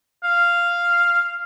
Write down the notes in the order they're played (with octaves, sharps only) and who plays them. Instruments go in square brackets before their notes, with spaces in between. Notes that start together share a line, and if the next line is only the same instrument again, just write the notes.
[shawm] F5